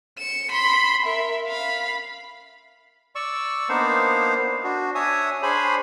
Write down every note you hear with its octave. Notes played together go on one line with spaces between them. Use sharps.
C#7 E7
B5 C6
A#4 E5
F5 B5
D5 C#6 E6
A#3 B3 D4 D#4 C5 F5
D4 F#4
D4 C#5 E5 G#5 D#6
D4 G#4 C5 C#5 G#5 B5